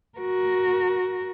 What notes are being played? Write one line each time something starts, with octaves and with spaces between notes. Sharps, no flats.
F#4 A#4